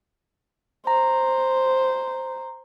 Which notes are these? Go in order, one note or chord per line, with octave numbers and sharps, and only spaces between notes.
C5 A#5